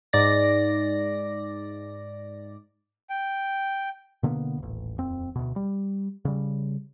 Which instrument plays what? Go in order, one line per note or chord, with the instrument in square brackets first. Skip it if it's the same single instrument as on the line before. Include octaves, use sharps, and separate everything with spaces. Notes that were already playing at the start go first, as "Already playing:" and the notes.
[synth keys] G#2 D5 A#6
[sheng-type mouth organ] G5
[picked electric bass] B2 D3 A#3 B3
D#1 A1
D#1 F2 C4
D2 B2
G3
C#3 G3